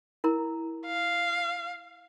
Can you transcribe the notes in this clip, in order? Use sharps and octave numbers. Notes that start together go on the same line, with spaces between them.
E4 A#4 A#5
F5